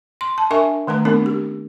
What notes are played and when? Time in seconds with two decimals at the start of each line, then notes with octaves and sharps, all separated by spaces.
0.21 C6
0.38 A5
0.50 D4 A#4 E5 G#5 C#6
0.87 D#3 A3 B4 A#5
1.05 A3 B3 C4 D4 D#4 A#4
1.26 G4